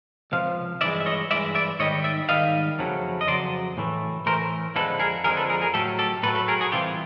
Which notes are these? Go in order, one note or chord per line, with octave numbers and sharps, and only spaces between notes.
C#2 C3 F3 F5
G2 E3 G#3 D5 E5
E5
C#5 D#5
G2 E3 G#3 D5 E5
D5 E5
G#2 D#3 G3 C#5 D#5
D5 E5
G#2 D#3 G3 D#5 F5
F2 C#3 F#3 A3
D#5
F2 C#3 F#3 C5 D5
A2 E3 A3
A2 E3 A3 A#4 C5
F2 D3 F3 G#3 A4 B4
G#4 A#4
F2 D3 F3 G#3 G#4 A#4
A4 B4
G#4 A#4
G#4 A#4
A2 F#3 A3 G4 A4
G4 A4
A2 F#3 A3 A4 B4
A4 B4
G#4 A#4
F#4 G#4
C2 C3 E3 F4 G4